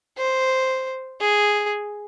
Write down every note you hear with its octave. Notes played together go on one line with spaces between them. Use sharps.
C5
G#4